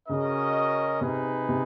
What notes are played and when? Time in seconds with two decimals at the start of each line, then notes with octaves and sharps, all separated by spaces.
0.09 C#3 C#4 F#4 A#4 D#5
1.01 C3 D#4 G#4 B4
1.49 C3